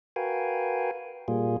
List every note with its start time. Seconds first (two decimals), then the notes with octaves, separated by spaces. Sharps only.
0.16 F#4 A#4 B4 F5 G5 G#5
1.28 A#2 G3 A#3 F4 G#4